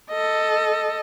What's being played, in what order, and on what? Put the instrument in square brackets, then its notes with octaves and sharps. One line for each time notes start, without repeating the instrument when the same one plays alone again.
[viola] A4 D#5